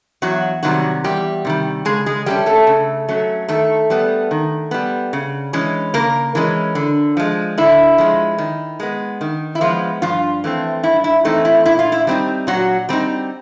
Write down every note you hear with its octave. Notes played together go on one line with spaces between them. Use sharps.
E2 F#3 F#4
C3 D#3 F#3 G3 F#4
E2 G3 G4
C3 D#3 G3
C#3 G#3 G#4
G#3 G#4
F#3 G3 A3 C#4 G4
A3 A4
C#3
F#3 A3 C#4
D#3 A3 A4
G3 B3
D#3
G3 B3
C#3
E3 G#3 C#4
C#3 A#3 A#4
E3 G#3 C#4
D3
F3 G#3
D3 E4
F3 G#3
D#3
G#3 B3
D#3
E4
F3 G#3 B3 F4
G2 F3 F4
E3 A3 C4
G2 E4
E4
E3 A3 C4 D#4
E4
A#2 E4
F4
E4
G3 C4 D#4
A#2 F#3 F#4
G3 C4 D#4